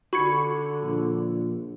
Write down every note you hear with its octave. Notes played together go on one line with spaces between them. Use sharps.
D3 F#4 B5 C#6 G#6 C#7
A#1